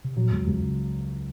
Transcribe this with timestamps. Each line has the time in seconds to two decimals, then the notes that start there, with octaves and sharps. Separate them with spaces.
0.05 C3
0.16 A#2 F#3
0.32 C#2 F#2
0.47 C#2 F#2
0.62 C#3